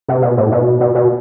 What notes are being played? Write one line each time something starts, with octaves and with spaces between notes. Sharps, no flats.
C3
B2
A2
B2
B2
B2